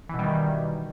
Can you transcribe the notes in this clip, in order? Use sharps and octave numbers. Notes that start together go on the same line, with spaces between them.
B2 D#3 E3 G3